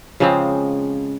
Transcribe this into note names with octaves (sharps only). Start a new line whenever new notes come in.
C#3 F3 G#3 C4